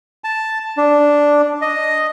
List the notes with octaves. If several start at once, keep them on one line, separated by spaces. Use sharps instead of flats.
A5
D4
D#5